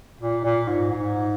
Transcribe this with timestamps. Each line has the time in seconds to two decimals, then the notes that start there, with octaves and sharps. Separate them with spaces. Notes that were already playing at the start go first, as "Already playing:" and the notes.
0.20 A#2
0.44 A#2
0.68 G#2
0.92 G#2